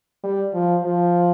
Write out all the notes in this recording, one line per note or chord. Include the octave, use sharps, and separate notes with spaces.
G3
F3
F3